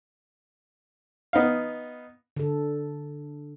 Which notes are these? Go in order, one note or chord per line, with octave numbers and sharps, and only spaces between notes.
B3 D#4 F5
D3 A4